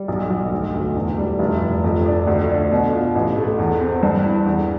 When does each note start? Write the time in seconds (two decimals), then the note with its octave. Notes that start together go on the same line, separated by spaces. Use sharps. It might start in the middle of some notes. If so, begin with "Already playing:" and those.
Already playing: G3
0.08 B1
0.30 B1
0.52 D2
0.74 D2
0.96 E1
1.18 G3
1.39 F1
1.61 F1
1.84 F2
2.06 D4
2.27 D2
2.49 D4
2.71 B2
2.93 F4
3.15 A1
3.37 A3
3.58 E2
3.80 C4
4.03 G2
4.24 E4
4.46 E2